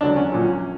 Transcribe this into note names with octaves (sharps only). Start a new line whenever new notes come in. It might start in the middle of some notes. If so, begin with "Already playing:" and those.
E1 E2 D3 F#3 D4
C#4
A#1 A#2 F#3